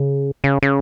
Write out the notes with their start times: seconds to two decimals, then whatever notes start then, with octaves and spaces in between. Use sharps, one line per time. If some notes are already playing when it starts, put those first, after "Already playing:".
Already playing: C#3
0.44 C#3
0.63 C#3